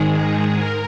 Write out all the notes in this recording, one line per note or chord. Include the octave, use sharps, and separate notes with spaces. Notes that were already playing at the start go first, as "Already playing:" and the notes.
Already playing: G#2 D#3 G#3 G#4
A#4